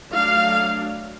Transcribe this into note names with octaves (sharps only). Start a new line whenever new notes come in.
F#3 A3 D4 F5